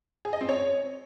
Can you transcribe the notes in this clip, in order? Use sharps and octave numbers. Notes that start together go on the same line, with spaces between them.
G#4
D#5
C4
C#5